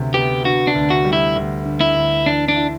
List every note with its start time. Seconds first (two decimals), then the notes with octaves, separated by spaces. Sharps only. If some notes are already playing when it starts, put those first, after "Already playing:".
Already playing: D2 C3 F#3 B3
0.14 B3 G4
0.45 D3 F#4
0.67 D4
0.75 D2
0.90 F#4
1.04 G3
1.13 E4
1.36 D2
1.65 D3
1.81 E4
1.96 D2
2.25 E3 D4
2.48 D4
2.56 E4